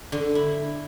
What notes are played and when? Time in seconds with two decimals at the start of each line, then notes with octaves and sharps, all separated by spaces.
0.12 D3
0.35 E4